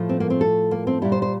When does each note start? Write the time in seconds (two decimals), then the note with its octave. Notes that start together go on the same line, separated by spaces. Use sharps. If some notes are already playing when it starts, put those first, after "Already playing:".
Already playing: A2 F3 A3
0.09 C4
0.20 A#3
0.30 C4
0.41 A4
0.71 A#3
0.87 C4
1.02 A#2 G3 E4
1.12 C5
1.22 C5